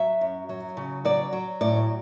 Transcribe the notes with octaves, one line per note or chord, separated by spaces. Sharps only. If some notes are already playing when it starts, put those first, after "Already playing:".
Already playing: F#3 E5
F#2
F#3
C#3
F#3 D5
F#3
A2 D5